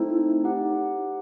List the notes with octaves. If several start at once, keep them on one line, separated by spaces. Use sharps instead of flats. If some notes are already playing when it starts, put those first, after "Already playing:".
Already playing: A3 C4 D#4 E4 A4 C5
D#4 G4 C5 F#5